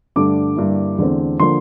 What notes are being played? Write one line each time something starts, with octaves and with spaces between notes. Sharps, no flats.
G2 D3 A3 D4 D6
G2 D3 G3 A#3 E4
E2 D3 A3 C4
D3 F3 A#3 C6